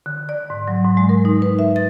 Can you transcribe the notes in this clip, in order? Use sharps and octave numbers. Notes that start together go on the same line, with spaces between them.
D3
D5
G#2
F#3
G#2
G#3
A#4
D#4
B4
E5
A6